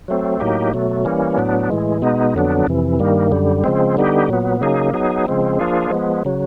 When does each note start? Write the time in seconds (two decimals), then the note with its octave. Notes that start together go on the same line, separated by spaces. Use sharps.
0.08 F#3 A3 C4
0.40 A2 F#3 A#3 D#4 G4
0.73 B2 F#3 A3
1.05 E3 G3 A#3 C#4
1.38 A2 F#3 B3 D4
1.70 A2 E3 G#3
2.02 B2 G#3 B3 D#4
2.35 F2 D3 F#3 B3 D4
2.67 F2 C3 E3
2.99 G2 D#3 G3 A#3
3.32 F#2 D3 G3
3.64 C#3 F3 G#3 C4
3.97 D3 G3 B3 D#4 G4
4.29 A#2 F#3 B3
4.61 C#3 F#3 A#3 D#4 G#4
4.94 F#3 B3 D#4 G#4
5.26 C#3 F3 G#3 C4
5.59 F3 A#3 D4 F4 G#4
5.91 F3 G#3 B3
6.25 C#3 F#3